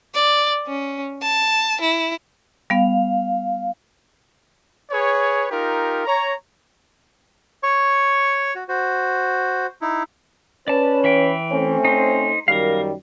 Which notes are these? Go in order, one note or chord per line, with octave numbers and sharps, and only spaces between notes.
D5
C#4
A5
E4
G3 B3 F5
G#4 B4 C#5
D#4 F4 G4 A#4
C#5 A#5
C#5 C#6
F#4
F#4 C5
D#4 E4
C#4 B4 D5 A5
E3 E5 G5
A3 C4 C#4
D#4 C5
F#2 D#3 G3 A#4 F5